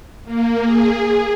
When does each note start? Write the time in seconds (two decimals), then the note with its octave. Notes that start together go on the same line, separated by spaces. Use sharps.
0.25 A#3
0.63 G#4